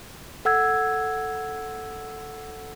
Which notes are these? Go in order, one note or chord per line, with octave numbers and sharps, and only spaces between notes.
A4 F#5 E6 G#6